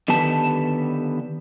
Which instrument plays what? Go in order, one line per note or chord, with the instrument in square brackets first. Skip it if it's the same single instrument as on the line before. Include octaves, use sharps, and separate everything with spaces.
[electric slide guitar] D3 D#3 B3 G4 B4 A5